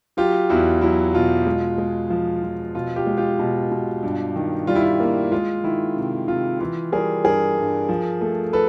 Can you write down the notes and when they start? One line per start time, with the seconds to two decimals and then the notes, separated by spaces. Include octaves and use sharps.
0.17 F#3 F4 G4
0.50 E2 E4 F#4
0.82 F#3 E4
1.14 B2 F4
1.46 G#3
1.78 G#3
2.10 F3
2.43 F3
2.75 B2 F4
2.96 F4 G4
3.07 G#3
3.17 F4 G4
3.39 B2
3.71 B2
4.03 G2
4.36 D#3
4.67 G3 F4
4.75 E4
4.83 F4
5.00 A#3
5.32 G#3 F4
5.64 D#3 E4
5.97 C3
6.28 C3 F4
6.60 E3 F4
6.92 G3 G#4 A#4
7.24 G2 G#4 A#4
7.58 G2
7.89 F3
8.21 A3
8.53 A4 B4